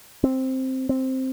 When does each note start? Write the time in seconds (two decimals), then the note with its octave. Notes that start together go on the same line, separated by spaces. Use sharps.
0.24 C4
0.89 C4